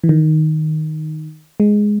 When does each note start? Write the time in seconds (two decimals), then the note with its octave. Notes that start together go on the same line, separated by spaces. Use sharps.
0.04 E3
0.09 D#3
1.60 G#3